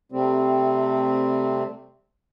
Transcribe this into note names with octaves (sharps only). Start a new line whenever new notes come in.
C3 G3 A3 C4